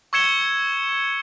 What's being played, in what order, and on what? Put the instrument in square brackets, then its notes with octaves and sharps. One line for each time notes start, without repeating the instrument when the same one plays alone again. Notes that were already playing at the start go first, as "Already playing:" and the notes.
[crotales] C#6 E6 G#6 C#7 E7 G7